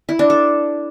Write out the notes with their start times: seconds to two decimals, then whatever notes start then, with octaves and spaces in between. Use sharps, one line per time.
0.09 E4
0.19 D4
0.30 A4